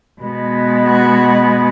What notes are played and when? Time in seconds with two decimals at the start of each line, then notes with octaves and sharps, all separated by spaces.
0.21 B2 G#3 B3
0.86 F#4